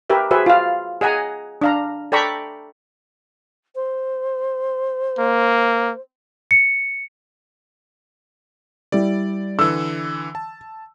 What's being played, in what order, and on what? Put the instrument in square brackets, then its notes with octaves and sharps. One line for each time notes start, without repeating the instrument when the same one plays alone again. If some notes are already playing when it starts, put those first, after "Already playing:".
[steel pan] G4 A#4 B4 E5
F#4 G#4 B4 C5 E5
F4 F5
G#4 D#5 F#5 G#5 A#5
D4 F5 A#5
A4 D5 G5 A#5 B5 C#6
[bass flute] C5
[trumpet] A#3
[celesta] C#7
[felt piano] G3 E4 G4 [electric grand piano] D5
[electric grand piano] D3 E3 [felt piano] E6
[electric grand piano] A5